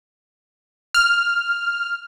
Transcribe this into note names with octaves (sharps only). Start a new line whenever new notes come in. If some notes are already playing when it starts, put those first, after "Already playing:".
F6